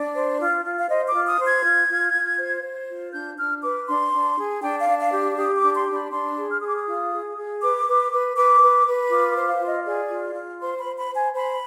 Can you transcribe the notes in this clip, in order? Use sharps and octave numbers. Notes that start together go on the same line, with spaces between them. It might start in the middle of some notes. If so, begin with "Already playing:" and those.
Already playing: D4 D5
C5
F4
F4
F5
C5 D#5
D6
F4
D#6
C5
G#6
F4
F4
F4
C5
C5
F4
D4 G6
D4 F6
B4 D6
D4 C6
D4
G#4
D4 G5
F5
D4
F5
G4
G4 D#6
D6
D4
C6
D4
B5
D4 C6
G#4
F6
G#4 D#6
D6
D#6
F4
G#4
G#4
B4 D6
B4
B4
B4 D6
B4
B4
F4 D6
D6
C5
F5
F4
D#5
G#4 D5
F4
F4
C5 C6
B5
C5
B5
C5
G#5
C5 B5